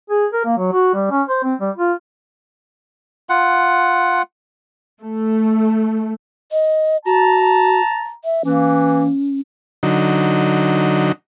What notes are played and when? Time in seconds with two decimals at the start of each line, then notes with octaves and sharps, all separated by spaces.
0.10 G#4
0.33 A#4
0.45 A#3
0.58 F#3
0.72 F#4
0.94 G3
1.11 C#4
1.29 C5
1.44 C4
1.61 G3
1.77 F4
3.29 F4 F#5
5.01 A3
6.52 D#5
7.05 F#4 A5 A#5
8.24 E5
8.45 E3 A#3 C#4
9.83 D3 F#3 D#4